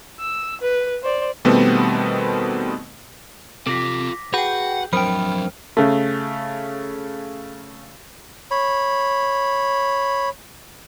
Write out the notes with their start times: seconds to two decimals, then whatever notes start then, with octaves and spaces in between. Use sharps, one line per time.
0.19 E6
0.61 B4
1.03 C5 D5
1.45 B2 D#3 G3 A3 B3 C4
3.67 C3 F4 A4 D6 A#6 B6
4.34 F#4 G#4 B4 F#5 G5 G6
4.93 F2 F#3 D4 A#4 C5 G5 B5 F6
5.77 C#3 A3
8.51 C#5 B5